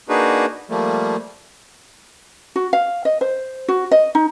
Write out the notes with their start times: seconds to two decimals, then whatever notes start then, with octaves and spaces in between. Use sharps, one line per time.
0.09 A#3 D4 D#4 F#4 G#4 B4
0.70 F3 G3 A3 A#3
2.56 F#4
2.73 F5
3.05 D#5
3.21 C5
3.68 F#4
3.91 D#5
4.15 D#4